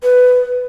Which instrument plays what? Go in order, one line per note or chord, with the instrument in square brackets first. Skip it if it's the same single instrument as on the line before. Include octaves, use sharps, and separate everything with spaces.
[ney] B4